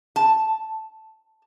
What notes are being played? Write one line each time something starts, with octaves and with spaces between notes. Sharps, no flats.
A5